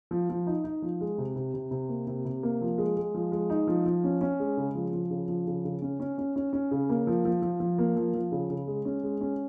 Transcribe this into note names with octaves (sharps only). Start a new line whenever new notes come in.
F3
F3
D#4
D#4
F3
G#3
C3
C3
C3
C3
A#3
C3
C3
A#3
F3
G#3
G#3
F3
G#3
D#4
F3
F3
C#4
C#4
G#3
C#3
F3
F3
C#3
F3
C#3
C#3
C#4
C#4
C#4
C#4
C#4
C#3
A#3
F3
F3
F3
F3
A#3
F3
F3
C#3
C#3
G#3
C#4
G#3
C#4